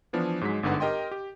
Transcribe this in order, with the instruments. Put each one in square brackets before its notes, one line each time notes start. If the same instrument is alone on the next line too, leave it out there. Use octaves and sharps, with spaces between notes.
[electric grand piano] E3 F3 B3 D4
G#2 F#3 G#3 B6
G1 G#2 D3 B4 F#5
G4 A#4 D#5 G5 C6
G4